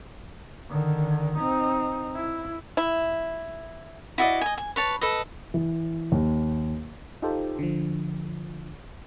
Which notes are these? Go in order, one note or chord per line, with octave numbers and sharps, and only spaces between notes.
D3 D#3
C4 D#4
E4
E4
E4 F#4 D5 D#5
D#5 G#5
G#5
B4 C#5 A5
A4 B4 D#5
E3
D#2
D#4 F4 G4 A4 C5
D3 F3